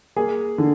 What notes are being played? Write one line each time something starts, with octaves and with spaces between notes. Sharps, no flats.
A#3 G#4
D3